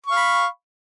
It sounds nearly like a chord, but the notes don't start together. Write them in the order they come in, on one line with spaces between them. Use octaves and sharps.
C#6 F5 B5